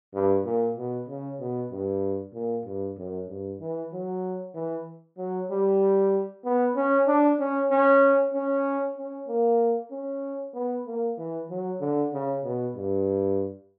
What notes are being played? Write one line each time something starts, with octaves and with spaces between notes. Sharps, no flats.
G2
A#2
B2
C#3
B2
G2
A#2
G2
F#2
G2
E3
F#3
E3
F#3
G3
B3
C#4
D4
C#4
C#4
C#4
C#4
A#3
C#4
B3
A#3
E3
F#3
D3
C#3
B2
G2